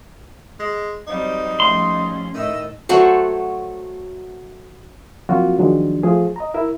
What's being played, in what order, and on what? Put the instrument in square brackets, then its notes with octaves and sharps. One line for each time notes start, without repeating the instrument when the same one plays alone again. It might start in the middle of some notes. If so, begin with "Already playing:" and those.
[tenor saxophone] G#3
[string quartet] F#3 G3 C4 [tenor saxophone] D#4
[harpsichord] C#2 A2 G3 [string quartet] F3 C#4 [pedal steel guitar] C6
[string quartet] A2 D#5 E6 [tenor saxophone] D#3 [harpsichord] D#4 E4 E5
[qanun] F#3 A3 F#4 C5
[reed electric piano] F3 F#3 A#3 C4 F4 F#4
D#3 F3 F#3 G#3 D4
F3 A3 G#4
D#5 A#5
E4 A#4 E5